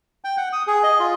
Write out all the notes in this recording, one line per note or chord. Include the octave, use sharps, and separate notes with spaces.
G5
F#5
D#6
G#4
D#5
F4